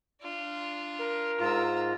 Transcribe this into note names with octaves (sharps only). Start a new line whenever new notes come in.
D4 F4
A#4
G#2 F4 A#5 E6